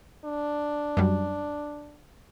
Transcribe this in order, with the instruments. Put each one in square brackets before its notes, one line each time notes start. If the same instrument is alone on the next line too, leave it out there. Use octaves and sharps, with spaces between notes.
[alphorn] D4
[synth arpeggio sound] F#2 F#3 G3